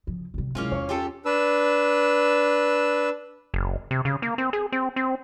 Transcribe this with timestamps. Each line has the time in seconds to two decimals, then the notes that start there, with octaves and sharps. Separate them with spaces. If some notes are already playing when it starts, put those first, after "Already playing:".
0.07 C#3 F3
0.34 C3 G3
0.55 C2 F#3 G#3 A#3 C#4 E4 F4
0.72 E2 C#5 C#6
0.89 C#4 F4 G4 A4
1.25 D4 B4 E6
3.54 F#1
3.91 C3
4.05 C#3
4.22 A#3
4.38 C4
4.53 G#4
4.72 C4
4.96 C4